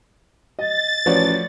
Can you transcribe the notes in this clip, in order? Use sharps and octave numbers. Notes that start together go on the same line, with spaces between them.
D#5 A6
A1 F3 A3 F#4 B4 C#5 D5